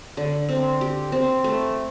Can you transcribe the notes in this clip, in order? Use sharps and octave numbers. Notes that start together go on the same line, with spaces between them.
D3
C4
G4
C4
A3